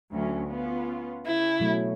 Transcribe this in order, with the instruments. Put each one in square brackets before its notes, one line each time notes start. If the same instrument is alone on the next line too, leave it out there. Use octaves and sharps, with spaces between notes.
[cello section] D2 F#3 C#4
B3 C#4 F4
[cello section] C#3 [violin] E4
[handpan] B2 F#3 A3